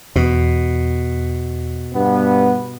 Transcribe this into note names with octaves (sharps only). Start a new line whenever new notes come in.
E2 B2
G2 B3